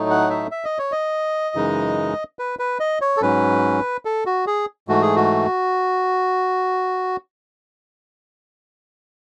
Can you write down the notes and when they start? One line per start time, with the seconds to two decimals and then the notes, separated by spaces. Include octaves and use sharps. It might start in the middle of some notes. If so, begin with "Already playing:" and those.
Already playing: A2 F#3 A3 D#4
0.10 F#5
0.30 E5
0.51 E5
0.65 D#5
0.79 C#5
0.92 D#5
1.55 F#2 C#3 E3 G#3 D#4
2.39 B4
2.59 B4
2.80 D#5
3.01 C#5
3.17 A4
3.22 G#2 F#3 C#4 B4
4.05 A4
4.26 F#4
4.47 G#4
4.88 G#2 E3 A3 F#4
5.02 G#4
5.16 F#4